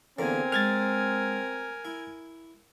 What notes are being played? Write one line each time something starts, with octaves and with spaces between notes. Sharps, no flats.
E2 D3 A#3 C4 A#4 G#5
G#3 F6 G#6 A6
E4